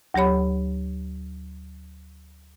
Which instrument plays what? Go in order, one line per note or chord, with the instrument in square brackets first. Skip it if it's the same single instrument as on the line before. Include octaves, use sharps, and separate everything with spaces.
[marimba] D2 F#3 G4 C#5 B5